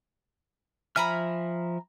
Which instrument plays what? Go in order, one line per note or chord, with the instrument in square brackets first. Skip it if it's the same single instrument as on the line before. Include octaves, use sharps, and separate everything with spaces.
[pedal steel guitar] F3 E5 F6 [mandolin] G#5 A#5 B5